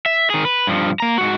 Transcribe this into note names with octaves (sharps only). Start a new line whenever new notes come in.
E5
D#3 G#4
B4
G2 F3
A#3 A#5
G#2 F#4